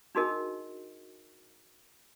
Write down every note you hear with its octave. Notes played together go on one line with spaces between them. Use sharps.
D4 D#4 F#4 G#4 A#4 D#5